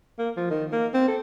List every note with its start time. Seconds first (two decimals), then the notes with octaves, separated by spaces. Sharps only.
0.18 A#3
0.37 F3
0.50 D#3
0.72 A#3
0.94 C4
1.08 A4